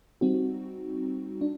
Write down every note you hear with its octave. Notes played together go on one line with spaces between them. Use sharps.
G3 C4 D#4 F#4
D4